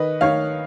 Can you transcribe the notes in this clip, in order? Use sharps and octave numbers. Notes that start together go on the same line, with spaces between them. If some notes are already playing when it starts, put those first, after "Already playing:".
Already playing: D#3 B4 D#5
D#3 C#5 F5